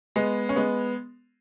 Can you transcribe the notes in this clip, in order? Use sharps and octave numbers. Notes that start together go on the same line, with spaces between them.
G#3 B3
C#4
G#3 B3